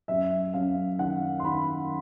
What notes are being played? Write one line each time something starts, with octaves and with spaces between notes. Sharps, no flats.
F#2 E5
F#2 F5
D#3 F#5
C6
D#3 B5